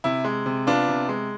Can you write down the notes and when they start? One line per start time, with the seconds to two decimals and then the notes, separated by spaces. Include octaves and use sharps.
0.04 C3 E4
0.25 G#3
0.46 C3
0.67 B3 D4 F4
0.88 C3
1.09 G#3